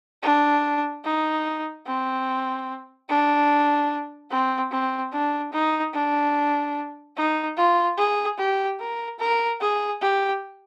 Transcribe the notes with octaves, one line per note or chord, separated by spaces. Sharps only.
D4
D#4
C4
D4
C4
C4
D4
D#4
D4
D#4
F4
G#4
G4
A#4
A#4
G#4
G4